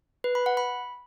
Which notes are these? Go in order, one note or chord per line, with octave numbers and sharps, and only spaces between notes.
B4
B5
F#5
B5